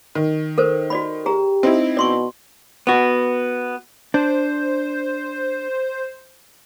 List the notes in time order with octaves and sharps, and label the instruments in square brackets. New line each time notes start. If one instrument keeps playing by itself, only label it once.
[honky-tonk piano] D#3
[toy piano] A4 A#4 C5
F#4 D5 B5
[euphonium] G4 [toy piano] G#4 A#5
[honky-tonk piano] C4 D#4 E4
[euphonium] B2 [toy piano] D5 C6 C#6
[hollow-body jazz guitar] B3 F#4
[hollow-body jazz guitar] D4 [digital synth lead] C5